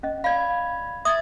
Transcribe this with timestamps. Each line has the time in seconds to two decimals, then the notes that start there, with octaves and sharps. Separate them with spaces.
0.03 C#4 D#5
0.24 D5 F5 B5 G#6
1.05 E5 D#6 G#6 A6